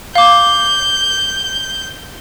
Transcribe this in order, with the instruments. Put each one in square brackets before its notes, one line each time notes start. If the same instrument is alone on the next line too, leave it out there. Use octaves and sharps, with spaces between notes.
[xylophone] F5 D6 [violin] G6